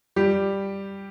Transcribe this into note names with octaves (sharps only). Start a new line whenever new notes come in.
G3 G4